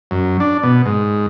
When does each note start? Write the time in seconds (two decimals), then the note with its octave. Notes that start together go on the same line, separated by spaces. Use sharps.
0.11 F#2
0.40 D4
0.63 B2
0.86 G#2